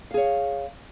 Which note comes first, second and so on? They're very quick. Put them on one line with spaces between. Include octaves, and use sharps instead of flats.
F5 G#4 C#5